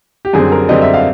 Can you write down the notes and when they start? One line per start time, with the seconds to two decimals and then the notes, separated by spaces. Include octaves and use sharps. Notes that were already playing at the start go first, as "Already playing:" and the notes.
0.25 G4
0.33 F#2 D3 G3 C4 G#4
0.52 A#4
0.69 F#2 D3 G3 C4 D#5
0.82 E5
0.94 F5